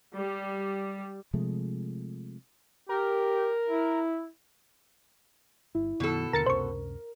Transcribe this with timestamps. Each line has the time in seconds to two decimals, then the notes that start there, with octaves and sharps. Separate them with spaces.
0.15 G3
1.34 C3 F3 G#3 A3
2.89 G4 A#4
3.69 E4
5.75 G1 E4
6.00 F#2 B2 D#3 B3 A4
6.33 D#2 D3 A#4 A#5 A6 C#7
6.46 C#2 F#2 C3 C5 C#6